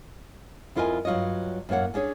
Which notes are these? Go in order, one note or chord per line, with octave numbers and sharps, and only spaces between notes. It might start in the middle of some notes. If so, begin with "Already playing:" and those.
F2 E4 F4 A#4 D#5 G#5
G2 F#3 F4 C#5 D#5
F#2 A2 A#3 C#5 F#5
C#4 D4 G#4 C#5